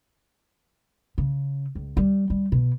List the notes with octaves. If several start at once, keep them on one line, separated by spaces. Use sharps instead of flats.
C#3
C#2
G3
G3
B2